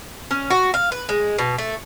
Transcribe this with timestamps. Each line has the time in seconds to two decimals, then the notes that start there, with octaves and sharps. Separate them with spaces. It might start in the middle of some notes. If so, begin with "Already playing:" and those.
0.31 C#4
0.50 F#4
0.74 F5
0.92 B4
1.09 G#3
1.38 B2
1.58 A3